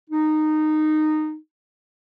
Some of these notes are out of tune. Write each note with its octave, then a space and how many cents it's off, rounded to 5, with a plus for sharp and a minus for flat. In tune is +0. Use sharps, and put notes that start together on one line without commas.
D#4 -15